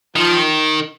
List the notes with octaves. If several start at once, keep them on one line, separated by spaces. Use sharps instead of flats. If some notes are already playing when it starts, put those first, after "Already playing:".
D#3 F3